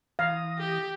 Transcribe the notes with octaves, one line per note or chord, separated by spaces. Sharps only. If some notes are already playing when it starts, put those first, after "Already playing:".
E3 F5 D#6 A#6
G4